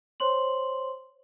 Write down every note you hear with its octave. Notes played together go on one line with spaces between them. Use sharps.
C5 C#5 C6 F#7